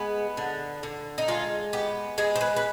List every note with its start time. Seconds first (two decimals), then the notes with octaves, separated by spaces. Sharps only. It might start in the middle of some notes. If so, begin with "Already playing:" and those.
Already playing: G#3 B3
0.37 D3
0.83 D3
1.18 D#4
1.28 G#3 F4
1.73 B3 G4
2.18 G#3 G#4
2.36 C5
2.41 B4
2.56 B4